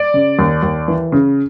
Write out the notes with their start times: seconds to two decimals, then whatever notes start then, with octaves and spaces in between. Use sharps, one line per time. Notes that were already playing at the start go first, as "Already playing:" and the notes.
Already playing: D5
0.14 C#3
0.39 D#2
0.63 D#2
0.88 E3
1.12 C#3